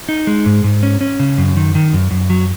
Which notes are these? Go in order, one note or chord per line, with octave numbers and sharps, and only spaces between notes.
D#4
G#3
G#2
G#2
C#4
C#4
C#3
F#2
D#3
D#3
F#2
F#2
F#3